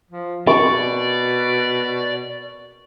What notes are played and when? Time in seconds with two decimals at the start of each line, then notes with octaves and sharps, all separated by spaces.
0.11 F3
0.47 B2 D5 C#6